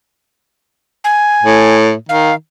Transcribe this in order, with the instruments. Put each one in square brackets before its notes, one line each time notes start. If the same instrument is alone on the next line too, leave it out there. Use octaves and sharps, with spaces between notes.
[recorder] G#5
[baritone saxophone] A2
[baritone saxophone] D#3 [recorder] F5